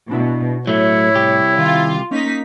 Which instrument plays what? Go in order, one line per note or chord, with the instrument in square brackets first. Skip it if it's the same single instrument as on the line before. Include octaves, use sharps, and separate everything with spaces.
[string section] B2 [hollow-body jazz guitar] D4 E4 E5
[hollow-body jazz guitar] A2 E5 [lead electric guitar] F#3 A3 [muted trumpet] E4 [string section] C#5
[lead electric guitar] C2 G4
[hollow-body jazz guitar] D#3 [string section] F4
[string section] A#3 D#4 B6 [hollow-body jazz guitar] C#4